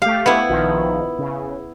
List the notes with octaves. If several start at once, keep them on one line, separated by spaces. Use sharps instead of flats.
A3 G4 F5
B3 E4
A#1 D#3 F3
C#3